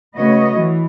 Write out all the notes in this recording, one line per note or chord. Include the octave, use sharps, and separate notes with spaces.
C#3 A3 F#4 B4 C#5 D#5
E3